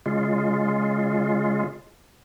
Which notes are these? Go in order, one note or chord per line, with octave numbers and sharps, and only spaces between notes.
C#3 G#3 F4